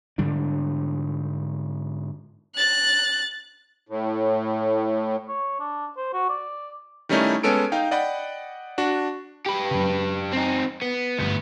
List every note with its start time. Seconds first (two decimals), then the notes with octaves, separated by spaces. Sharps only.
0.18 G#2 D3 G3 D4
2.55 F#6 A6
3.89 A2
5.28 C#5
5.60 D4
5.97 C5
6.13 F#4
6.29 D5
7.09 D#3 G3 A3 C#4 D#4 E4
7.43 G#3 B3 C#4 A4 D7
7.72 D#4 F5 G5
7.91 D5 D#5 F#5 G5 B5
8.78 D4 F#4
9.46 G4 B4
9.71 F#2 C#3
10.32 C4 D#4
10.82 B3
11.19 G#1 D2 G2 B3